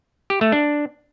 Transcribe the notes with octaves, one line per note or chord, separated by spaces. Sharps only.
G4
A3
D4